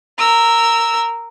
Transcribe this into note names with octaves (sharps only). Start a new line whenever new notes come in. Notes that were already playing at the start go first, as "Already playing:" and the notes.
A#4 E6